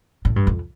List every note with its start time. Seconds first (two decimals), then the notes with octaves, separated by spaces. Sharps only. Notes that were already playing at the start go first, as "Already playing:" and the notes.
0.25 A2
0.36 G2
0.47 F2